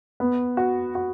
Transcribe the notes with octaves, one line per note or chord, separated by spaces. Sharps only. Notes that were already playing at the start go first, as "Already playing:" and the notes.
B3
F#4
F#4